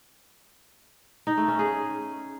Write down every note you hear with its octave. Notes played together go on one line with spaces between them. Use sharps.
D#4
A3
C#4
G#4